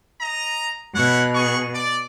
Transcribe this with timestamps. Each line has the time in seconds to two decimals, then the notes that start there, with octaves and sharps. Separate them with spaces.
0.21 D#5 A#5
0.95 B2 E4 C#5 F#5
1.34 G#4 F#5 C#6
1.75 D5